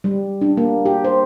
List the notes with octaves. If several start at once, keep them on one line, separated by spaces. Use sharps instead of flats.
G3
D4
A#3
G4
C5